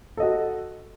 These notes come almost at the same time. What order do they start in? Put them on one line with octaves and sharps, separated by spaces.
A4 D#5 F#4